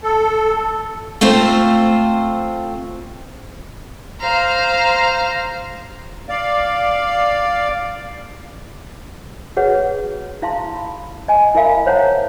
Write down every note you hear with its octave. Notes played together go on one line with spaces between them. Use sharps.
A4
A3 C4 F4 C5
C5 F5 A#5
D5 F5
F#4 G#4 B4 C#5 F#5
E4 F5 A5 C6
B5
D#5 G#5
E4 A#4 E5 F5 B5
C5 C#5 F5 F#5 A5 A#5